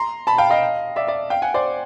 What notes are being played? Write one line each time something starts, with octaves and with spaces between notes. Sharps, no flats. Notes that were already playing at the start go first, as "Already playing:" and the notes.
Already playing: A#5 C6
A5 B5
F5 G5
D#5 F5
D5 E5
D5 E5
F5 G5
F#5 G#5
C5 D5